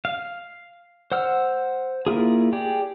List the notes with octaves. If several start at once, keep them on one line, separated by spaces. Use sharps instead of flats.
F5
C5 F#5 E6 F6
A#3 E4 F4 G#4
G4 G#4 D5